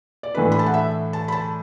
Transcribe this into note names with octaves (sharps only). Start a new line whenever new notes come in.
D5
A2 E3 A3 D4 B4
B5
A5
F#5
E5
A5
B5
A5